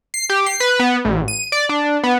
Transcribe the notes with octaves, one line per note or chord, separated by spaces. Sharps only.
C7
G4
C7
B4
B3
A1
D#7
D5
D4
B3